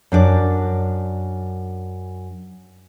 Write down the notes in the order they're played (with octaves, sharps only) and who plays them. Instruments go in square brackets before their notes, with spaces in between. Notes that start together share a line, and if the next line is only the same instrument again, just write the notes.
[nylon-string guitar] F#2 D4 D5